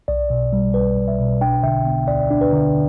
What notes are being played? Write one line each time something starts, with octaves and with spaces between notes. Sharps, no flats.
B1 D5
B2
G3
B1 B4
B1
E5
B2
D4 G5
D3 E5
B3
D2 D5
D4
B4
D3